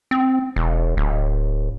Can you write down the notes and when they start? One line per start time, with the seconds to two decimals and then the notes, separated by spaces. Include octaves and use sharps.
0.11 C4
0.56 E1
0.97 D1